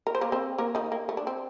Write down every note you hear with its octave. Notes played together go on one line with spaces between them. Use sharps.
A#4
C5
A#3 A#4
C4 C5
A#3 A#4
D#3 D#4
A#3
A3
D4
C4